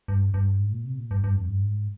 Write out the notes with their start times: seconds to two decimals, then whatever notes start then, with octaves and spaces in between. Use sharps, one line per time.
0.08 G2
0.34 G2
0.59 G#2
0.72 A#2
0.85 C3
0.98 A#2
1.11 G2
1.24 G2
1.36 F2
1.48 G2
1.61 G#2